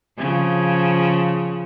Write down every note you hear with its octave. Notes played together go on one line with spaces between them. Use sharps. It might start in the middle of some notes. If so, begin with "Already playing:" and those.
C#3 F3